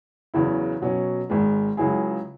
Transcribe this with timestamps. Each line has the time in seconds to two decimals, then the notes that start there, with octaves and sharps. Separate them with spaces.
0.34 E2 C#3 F#3 E4
0.82 B2 F#3 C#4
1.30 G#1 G#2 G#3
1.77 C#2 C#3 F#3 E4 G#4